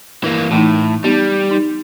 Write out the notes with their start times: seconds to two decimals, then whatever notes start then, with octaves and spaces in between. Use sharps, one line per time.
0.24 E3 A#3
0.51 A2 E3 A3 D#4
1.04 G3 B3 D#4 G4
1.51 D#4